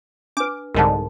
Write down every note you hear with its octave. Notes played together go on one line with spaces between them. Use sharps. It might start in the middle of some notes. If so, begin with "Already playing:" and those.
D4 B4 D6
C2 G#2 D3 A#4 A5